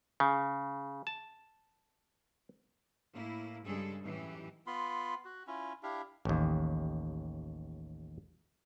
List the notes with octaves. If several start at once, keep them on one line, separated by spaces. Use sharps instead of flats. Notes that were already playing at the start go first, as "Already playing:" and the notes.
C#3
A5
A2 A#3 E4
G2 C#3 G3 G#3 G#4 A4
F#2 A2 E3 D#4 G4
B3 F4 B5 C6
F#4
C#4 E4 F4
D4 E4 G4 F5
A1 D#2